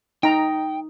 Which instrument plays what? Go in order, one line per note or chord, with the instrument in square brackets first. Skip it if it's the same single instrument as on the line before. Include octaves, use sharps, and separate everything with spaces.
[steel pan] D#4 A#5 [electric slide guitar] G5